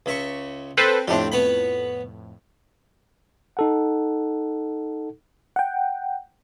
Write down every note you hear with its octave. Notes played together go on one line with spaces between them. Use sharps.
C#2 E5 C#6
C4 A4 B4 C5
F2 A2 C4 D4 G4
B3 C#5 B5
D#4 A4 F#5
F#5 G5